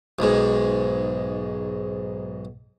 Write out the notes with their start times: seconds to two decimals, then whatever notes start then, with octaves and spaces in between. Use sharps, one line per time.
0.19 B1 G#2